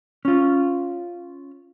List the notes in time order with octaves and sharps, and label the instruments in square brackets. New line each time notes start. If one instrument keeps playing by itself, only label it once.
[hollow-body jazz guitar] C#4 F4